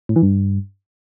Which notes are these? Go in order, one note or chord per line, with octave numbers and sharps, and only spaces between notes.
A2
E3
G2